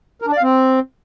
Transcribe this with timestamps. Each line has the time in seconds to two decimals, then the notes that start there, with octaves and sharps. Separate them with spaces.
0.22 A#4
0.27 D4
0.32 D5
0.37 F5
0.42 C4